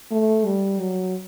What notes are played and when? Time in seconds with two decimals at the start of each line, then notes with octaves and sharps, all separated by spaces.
0.11 A3
0.45 G3
0.80 F#3